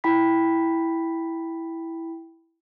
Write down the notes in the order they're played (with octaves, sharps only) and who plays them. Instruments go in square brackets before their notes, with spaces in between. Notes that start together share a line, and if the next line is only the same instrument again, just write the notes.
[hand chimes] E4 G5 B5 B6